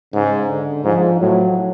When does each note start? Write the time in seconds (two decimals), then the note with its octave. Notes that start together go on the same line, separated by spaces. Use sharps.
0.13 G#2 C#3
0.49 D3
0.84 G#2 F3
1.21 A2 F#3